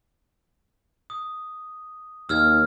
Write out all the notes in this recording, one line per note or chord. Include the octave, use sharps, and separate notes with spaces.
D#6
D#2 E6 F6 G#6